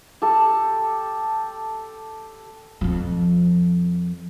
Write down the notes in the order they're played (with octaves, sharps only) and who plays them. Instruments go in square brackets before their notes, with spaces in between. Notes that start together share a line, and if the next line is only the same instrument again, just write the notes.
[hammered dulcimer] G4 A4
[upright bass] F2 F3